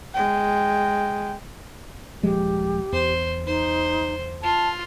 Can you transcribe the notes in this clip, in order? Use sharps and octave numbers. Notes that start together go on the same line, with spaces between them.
G#3 G5
D#1 F3 G#3 G4
E2 C5
D#4 C5
F4 A5